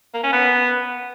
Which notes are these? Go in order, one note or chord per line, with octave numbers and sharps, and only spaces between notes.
A#3
C#4
B3